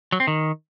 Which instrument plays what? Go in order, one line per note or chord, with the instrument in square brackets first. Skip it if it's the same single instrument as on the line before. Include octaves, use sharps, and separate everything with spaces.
[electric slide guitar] F#3
C4
D#3